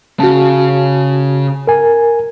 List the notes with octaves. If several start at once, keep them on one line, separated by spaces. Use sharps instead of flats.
C#3 F#4 A5
A#4 G#5